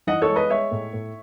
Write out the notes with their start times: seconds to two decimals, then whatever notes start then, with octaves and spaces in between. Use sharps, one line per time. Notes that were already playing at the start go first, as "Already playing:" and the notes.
0.07 E3 D#5 F#5
0.22 A4 C#5
0.29 G#3
0.36 B4 D#5
0.50 G#3 C#5 E5
0.71 A2
0.93 A2